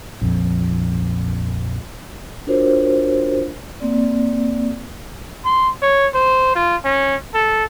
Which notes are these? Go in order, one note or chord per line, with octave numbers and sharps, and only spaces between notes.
A#1 F2
D4 F4 F#4 A#4 C5 C#5
A#3 C4 D5
C6
C#5
C5
F4
C#4
A4